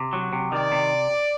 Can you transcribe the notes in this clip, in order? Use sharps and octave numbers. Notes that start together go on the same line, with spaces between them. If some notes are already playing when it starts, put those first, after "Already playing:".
Already playing: C3
F#3
C3
D#3 D5
C3